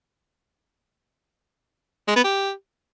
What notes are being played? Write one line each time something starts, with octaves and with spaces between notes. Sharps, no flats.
G#3
B3
G4